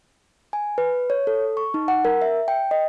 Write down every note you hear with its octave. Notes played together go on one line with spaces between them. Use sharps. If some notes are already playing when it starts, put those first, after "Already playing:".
G#5
B4
C#5
A4
C#6
D#4
F#5
A#4
E5
G5
D#5